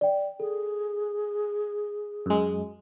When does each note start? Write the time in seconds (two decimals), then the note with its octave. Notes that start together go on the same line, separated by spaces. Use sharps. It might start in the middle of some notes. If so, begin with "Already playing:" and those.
0.01 D5 G5
0.40 G#4 A4
2.26 F#2 G#3